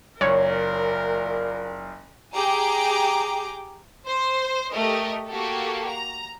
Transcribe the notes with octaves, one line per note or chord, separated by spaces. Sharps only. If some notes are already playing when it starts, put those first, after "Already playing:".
F#1 A#2 A#4 C#5
G4 G#4 G5 A#5 D6
C5
A3 G4 A#4 D#5
A#3 F#4 G4 A4
A#5